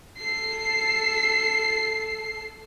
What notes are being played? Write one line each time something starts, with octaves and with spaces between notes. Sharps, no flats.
A4 C7